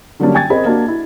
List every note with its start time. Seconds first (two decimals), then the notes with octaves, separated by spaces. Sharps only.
0.20 D3 F#3 G3 A#3 C#4 D4
0.34 G5 G#5 G#6 A6
0.50 C4 G#4 A#4 C5 D#5 B5
0.65 A#3 D4 F#4
0.88 E4